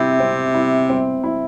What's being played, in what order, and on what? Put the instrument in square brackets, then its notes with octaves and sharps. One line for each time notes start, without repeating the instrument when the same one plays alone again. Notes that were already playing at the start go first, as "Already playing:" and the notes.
Already playing: [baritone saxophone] C3 [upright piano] C4 E4
[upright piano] C4
E4
C4
E4